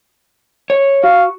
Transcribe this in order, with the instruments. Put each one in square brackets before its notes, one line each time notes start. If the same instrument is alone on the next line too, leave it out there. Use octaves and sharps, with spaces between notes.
[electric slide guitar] C#5
[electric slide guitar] F#4 [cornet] F5